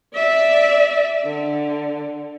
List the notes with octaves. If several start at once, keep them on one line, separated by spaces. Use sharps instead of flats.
D5 E5
D3